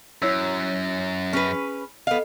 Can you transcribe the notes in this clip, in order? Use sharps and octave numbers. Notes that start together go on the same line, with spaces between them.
F#2 E4 C#5 E6
C#4 G#4 B4
B3 A4 D#5 F5